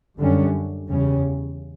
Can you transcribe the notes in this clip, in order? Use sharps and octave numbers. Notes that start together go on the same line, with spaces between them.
F#2 D3 G3 C#4
E2 C#3 G3 C#4